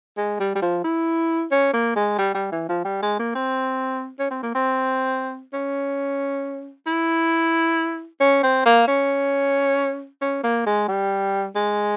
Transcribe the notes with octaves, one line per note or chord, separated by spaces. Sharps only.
G#3
G3
G3
F3
E4
C#4
A#3
G#3
G3
G3
E3
F3
G3
G#3
A#3
C4
C#4
C4
A#3
C4
C#4
E4
C#4
C4
A#3
C#4
C#4
A#3
G#3
G3
G#3